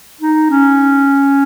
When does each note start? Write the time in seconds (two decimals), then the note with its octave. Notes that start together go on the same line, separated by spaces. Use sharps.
0.21 D#4
0.50 C#4